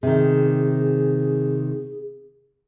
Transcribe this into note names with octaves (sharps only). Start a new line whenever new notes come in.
C3 D#3 G#4